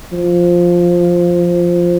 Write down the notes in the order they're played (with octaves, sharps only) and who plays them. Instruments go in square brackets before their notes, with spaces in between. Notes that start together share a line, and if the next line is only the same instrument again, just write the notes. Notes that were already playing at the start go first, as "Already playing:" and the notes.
[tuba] F3